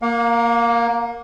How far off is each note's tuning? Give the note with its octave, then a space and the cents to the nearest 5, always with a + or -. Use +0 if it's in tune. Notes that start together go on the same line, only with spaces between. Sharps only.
A#3 +0 F5 +40